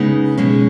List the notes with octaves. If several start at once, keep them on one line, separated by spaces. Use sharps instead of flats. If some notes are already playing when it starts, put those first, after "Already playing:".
Already playing: C#3 G#3 B3 D#4 D#5
B2 G#3 C#4